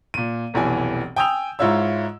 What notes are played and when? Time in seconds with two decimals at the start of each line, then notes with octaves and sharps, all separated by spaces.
0.14 A#2 D#7
0.54 F1 B1 E3 G#5
1.16 G5 G#5 D#6 E6 G6 F7
1.59 G#2 E4 F4 C#5 E6